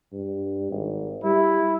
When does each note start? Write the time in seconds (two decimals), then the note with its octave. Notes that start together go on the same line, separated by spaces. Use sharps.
0.12 G2
0.72 G#1
1.24 G3 E4